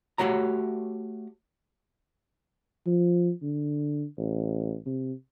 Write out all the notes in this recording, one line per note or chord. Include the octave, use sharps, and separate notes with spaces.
A3 F#4 G4 C#5 A#5
F3
D3
A1
C3